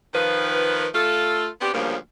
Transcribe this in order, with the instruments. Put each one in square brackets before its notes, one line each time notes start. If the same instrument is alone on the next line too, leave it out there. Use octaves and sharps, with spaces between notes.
[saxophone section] D#3 F3 B4
A3 F4 A4
B3 C4 D4 G4
D2 G2 C#3 F3 G3 A#3